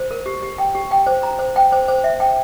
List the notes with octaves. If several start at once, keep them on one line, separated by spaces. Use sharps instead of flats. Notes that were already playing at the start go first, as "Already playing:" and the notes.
Already playing: C5
A#4
G4
G4
G5
G4
G5
C5
A#5
C5
G5
C5
C5
E5
G5